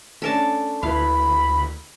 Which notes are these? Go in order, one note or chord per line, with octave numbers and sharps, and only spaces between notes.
A3 C#4 D4 A4 A#4 A5
D2 E4 B4 F5 B5